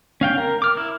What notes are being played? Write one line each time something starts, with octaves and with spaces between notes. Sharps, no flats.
C#4 F5 G5
A#4
D6 F6
E4